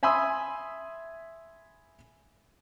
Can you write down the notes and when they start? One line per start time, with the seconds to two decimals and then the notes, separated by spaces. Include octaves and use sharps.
0.03 E5 G#5 B5 C6 D#6 E6